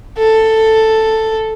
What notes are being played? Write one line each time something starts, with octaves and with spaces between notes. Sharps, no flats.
A4